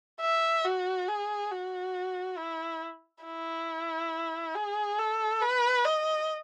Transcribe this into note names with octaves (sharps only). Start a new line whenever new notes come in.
E5
F#4
G#4
F#4
E4
E4
G#4
A4
B4
D#5